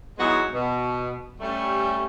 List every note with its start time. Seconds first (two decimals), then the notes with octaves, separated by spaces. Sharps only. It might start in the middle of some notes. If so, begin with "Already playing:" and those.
0.18 E3 F#3 G#3 B3 D#4 F#4
0.53 B2
1.40 G3 A3 C#4